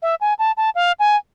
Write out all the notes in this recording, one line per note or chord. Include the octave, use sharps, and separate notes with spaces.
E5
G#5
A5
A5
F5
G#5